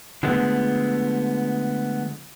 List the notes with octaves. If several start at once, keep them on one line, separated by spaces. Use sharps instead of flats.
D3 F3 G#3 A3 B3